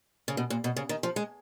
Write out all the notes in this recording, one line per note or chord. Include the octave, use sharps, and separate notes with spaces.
C#3
B2
A#2
B2
C#3
D#3
F3
G#3